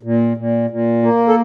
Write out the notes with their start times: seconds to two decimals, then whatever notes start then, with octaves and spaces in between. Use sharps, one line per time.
0.03 A#2
0.37 A#2
0.70 A#2
1.02 A#3
1.29 A4